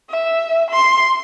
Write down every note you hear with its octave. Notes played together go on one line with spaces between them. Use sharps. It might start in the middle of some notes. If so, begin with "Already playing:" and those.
E5
C6